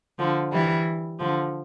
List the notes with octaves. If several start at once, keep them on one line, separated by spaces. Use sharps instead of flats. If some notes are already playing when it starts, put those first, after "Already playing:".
D3 F3
E3 G3
D3 F3